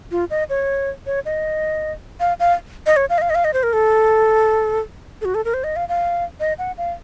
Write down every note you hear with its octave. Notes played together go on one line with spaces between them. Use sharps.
F4
D#5
C#5
C#5
D#5
F5
F5
D#5
C#5
F5
D#5
F5
D#5
F5
D#5
C5
A#4
A4
A4
F#4
A4
A#4
C5
D#5
F5
F5
D#5
F#5
F5